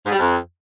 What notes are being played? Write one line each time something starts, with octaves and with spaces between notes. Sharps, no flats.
G#2
G3
F2